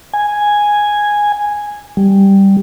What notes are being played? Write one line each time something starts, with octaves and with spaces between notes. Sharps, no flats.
G#5
G3